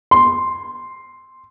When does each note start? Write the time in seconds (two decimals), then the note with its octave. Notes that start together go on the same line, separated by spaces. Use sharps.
0.11 C6